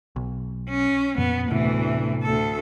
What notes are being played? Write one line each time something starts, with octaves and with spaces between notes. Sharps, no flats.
B1
C#4
F2 A#2 B3
D2 A2 C3 E3 B3
D2 A4